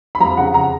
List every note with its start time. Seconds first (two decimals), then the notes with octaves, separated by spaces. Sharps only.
0.15 B5
0.20 F2 A#5
0.37 C#3 F#5
0.54 A#5